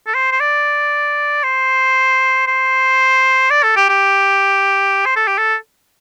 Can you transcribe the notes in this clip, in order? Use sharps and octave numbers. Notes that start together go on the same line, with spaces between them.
A4
C5
C5
D5
C5
C5
D5
A4
G4
G4
C5
A4
G4
A4